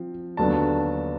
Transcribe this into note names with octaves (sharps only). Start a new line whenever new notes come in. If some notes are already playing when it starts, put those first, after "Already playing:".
Already playing: F3 C4
D#2 D3 F#3 B3 D4 A5